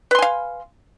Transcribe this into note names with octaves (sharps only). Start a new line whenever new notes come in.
B4 F5 G#5 C6